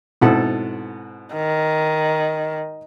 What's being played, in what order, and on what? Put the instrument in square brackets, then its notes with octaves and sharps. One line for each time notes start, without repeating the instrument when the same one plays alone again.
[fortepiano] G#2 B2 F#5 [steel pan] C4 E4 A4
[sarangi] D#3